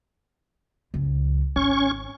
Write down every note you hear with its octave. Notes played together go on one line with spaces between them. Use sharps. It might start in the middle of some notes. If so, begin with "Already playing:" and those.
C#2 F#2
G#1 C#4 C#6